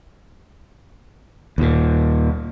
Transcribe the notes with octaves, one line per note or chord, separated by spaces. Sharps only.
D#2 A#2